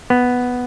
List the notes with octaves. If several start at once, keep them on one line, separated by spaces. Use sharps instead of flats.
B3